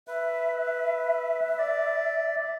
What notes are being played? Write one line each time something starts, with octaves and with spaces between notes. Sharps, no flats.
B4 E5
D5